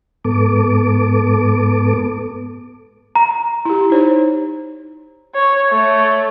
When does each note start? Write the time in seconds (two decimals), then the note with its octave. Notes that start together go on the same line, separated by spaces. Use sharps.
0.25 G#2 B3 A4 D6
3.15 A#5
3.65 E4 G4
3.90 D#4 C5 C#5
5.35 C#5
5.70 A3 C#5